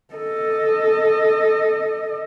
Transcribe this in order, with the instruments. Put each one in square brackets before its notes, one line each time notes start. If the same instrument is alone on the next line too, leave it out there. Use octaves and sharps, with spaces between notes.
[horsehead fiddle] A4 D#5